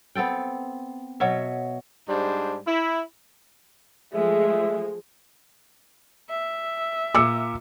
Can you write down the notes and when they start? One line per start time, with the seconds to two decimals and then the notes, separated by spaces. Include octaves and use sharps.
0.15 B3 C4 A4 G5
1.20 B2 F#3 C#5 E5
2.08 G#2 G3 D4 C5
2.66 E4
4.14 F3 G#3 A3 E5
6.29 E5
7.15 A#2 D6 E6 C#7